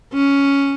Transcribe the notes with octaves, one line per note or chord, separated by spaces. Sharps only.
C#4